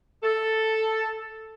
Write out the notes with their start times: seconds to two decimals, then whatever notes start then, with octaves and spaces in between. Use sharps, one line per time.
0.23 A4